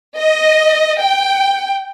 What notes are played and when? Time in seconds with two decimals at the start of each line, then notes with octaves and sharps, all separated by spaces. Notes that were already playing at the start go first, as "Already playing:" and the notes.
0.19 D#5
1.01 G5